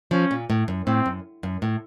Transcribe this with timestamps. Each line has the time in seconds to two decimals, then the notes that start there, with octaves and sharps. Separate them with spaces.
0.11 F3 C#4
0.31 A#2
0.50 A2
0.68 F#2
0.86 A2 C4
1.06 F#2
1.43 F#2
1.62 A2